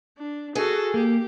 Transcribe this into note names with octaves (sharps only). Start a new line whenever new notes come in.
D4
F#4 G#4 A4
A#3 G4